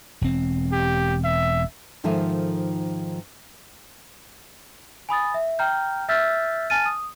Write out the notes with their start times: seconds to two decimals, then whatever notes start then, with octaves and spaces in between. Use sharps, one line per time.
0.21 E1 C4
0.72 G4
1.24 E5
2.04 G#2 D#3 F3 A4 E5 G#5
5.09 G#5 B5 D#6 A6
5.34 E5
5.59 G5 A#5 F6 G6
6.09 E5 E6 F6 G6 A6 B6
6.70 G#5 A5 F6 A6 D#7
6.86 D#6